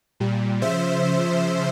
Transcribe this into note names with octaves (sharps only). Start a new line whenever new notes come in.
A#2 G3
C#3 F3 C5 E5